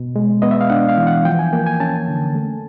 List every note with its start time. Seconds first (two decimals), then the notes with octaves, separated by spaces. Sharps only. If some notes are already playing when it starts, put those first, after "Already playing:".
Already playing: B2
0.16 G#3
0.42 B3 D#5
0.51 E5
0.61 F5
0.70 D4 F#5
0.89 F5
0.98 E3
1.07 F#5
1.25 F3 G5
1.39 G#5
1.53 A#3 G5
1.67 G#5
1.80 C#4 A5
2.08 D3
2.35 A3